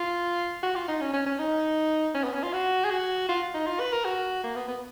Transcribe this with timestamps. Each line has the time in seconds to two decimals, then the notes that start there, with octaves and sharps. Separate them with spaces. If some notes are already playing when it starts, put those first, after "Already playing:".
Already playing: F4
0.63 F#4
0.75 F4
0.88 D#4
1.01 C#4
1.13 C#4
1.26 C#4
1.39 D#4
2.14 C#4
2.24 B3
2.34 C#4
2.43 F4
2.53 F#4
2.84 G#4
2.91 F#4
3.29 F4
3.54 D#4
3.67 F4
3.80 B4
3.92 A#4
4.05 F#4
4.43 A#3
4.56 B3
4.68 B3